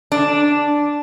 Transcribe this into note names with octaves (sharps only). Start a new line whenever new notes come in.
D4